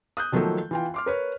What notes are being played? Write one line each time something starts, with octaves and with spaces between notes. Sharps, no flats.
D#6 F#6 G6
D#3 F3 F#3 A3 A#3 A4
E3 F4 G5
C6 D6 F6
A#4 B4 C#5